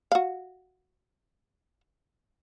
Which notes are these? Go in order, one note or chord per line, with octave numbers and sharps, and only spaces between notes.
F#4 F5